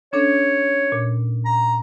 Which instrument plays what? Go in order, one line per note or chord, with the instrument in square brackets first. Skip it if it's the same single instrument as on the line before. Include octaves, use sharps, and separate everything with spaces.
[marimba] C#4 D4 A4 [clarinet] C#5
[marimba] A#2
[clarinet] A#5